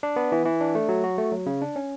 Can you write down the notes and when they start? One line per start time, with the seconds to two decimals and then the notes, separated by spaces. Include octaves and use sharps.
0.03 D4
0.16 B3
0.32 E3
0.45 E3
0.61 D4
0.75 A3
0.89 F#3
1.04 F#4
1.18 A3
1.32 F#3
1.46 C#3
1.62 D4
1.76 C#4